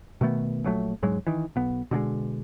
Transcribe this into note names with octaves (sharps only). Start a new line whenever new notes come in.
B2 D#3 A3 B3
A#1 F#3 A3
E1 G#2 F#3 G#3
D#3 E3
B1 B3
B2 D3 F#3 G#3